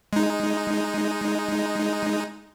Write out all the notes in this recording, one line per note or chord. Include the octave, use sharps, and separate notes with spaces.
G#3 D#4